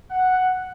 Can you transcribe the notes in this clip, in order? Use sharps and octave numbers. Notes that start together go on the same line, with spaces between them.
F#5